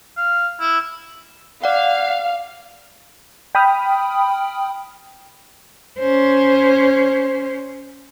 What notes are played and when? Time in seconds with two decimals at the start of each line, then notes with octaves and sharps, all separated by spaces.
0.17 F5
0.60 E4
1.64 D5 F5 F#5
3.55 G5 B5 D#6 F6
5.99 C#4 C5